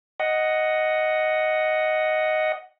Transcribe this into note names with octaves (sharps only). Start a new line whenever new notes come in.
D#5 F#5